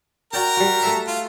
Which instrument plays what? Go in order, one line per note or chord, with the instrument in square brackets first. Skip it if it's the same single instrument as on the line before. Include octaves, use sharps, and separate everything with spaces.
[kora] F#4 D5 G5 [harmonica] A#4 A#5
[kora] G3 F#4
A3 A4 E5
[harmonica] F4